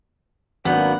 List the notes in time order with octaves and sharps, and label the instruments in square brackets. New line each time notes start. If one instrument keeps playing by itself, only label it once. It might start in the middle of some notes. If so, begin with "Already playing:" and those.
[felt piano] G#1 F#3 G6 [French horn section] A#3 D4 [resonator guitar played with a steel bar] B3 [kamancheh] F#5